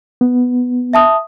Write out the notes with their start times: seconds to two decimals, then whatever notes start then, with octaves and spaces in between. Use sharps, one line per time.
0.21 B3
0.93 E5 A5 D#6